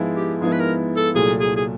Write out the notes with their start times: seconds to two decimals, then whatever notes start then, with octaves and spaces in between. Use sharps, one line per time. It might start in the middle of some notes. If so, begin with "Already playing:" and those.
Already playing: G#2 F3 G#3 B3 E4
0.16 G4
0.41 G#2 F3 G#3 B3 E4 G#4
0.52 B4
0.60 A#4
0.97 A4
1.15 C2 A#2 F#3 A3 G#4
1.40 G#4
1.56 G#4